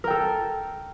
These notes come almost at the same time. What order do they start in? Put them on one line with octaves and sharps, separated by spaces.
A#4 G5 A4